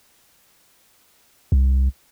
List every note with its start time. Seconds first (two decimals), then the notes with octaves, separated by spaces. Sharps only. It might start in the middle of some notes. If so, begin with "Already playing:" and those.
1.52 C2